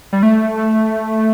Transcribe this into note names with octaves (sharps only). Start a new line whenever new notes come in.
G3
A3